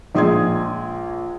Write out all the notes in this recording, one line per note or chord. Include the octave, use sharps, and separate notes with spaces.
A#1 G#3 C6 D#6 G#6